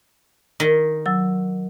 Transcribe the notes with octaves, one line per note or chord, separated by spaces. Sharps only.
D#3
F#3 E6